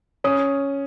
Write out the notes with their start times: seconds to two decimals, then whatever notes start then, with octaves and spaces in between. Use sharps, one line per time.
0.24 C#4 D#6